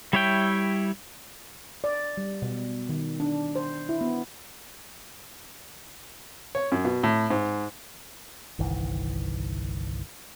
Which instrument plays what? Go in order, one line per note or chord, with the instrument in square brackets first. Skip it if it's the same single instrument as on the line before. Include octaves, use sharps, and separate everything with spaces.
[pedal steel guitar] G3 E4 C#5 E5 G5
[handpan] D5
G3
B2
D#3
D4
C5
E4
B3
[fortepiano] C#5
F#2
B2
A2
G#2
[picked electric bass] G1 C2 D#3 E3